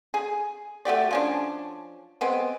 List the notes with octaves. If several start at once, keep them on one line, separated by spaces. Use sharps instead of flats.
G#4
A3 F#4 G4 D5
F3 C#4 D4
G#3 B3 C4